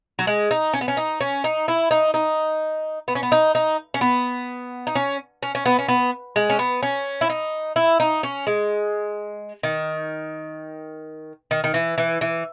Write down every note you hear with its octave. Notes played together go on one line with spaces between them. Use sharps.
F#3
G#3
D#4
C#4
B3
C#4
D#4
C#4
D#4
E4
D#4
D#4
B3
C#4
B3
D#4
D#4
C#4
B3
D#4
C#4
C#4
C#4
B3
C#4
B3
G#3
C#4
B3
C#4
E4
D#4
E4
D#4
C#4
G#3
D#3
D#3
D#3
E3
E3
E3